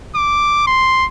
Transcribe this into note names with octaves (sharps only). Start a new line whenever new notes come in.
D6
C6